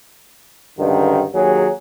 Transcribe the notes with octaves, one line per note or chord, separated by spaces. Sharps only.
C#2 G2 D3 D#3
D#2 F#3 G#4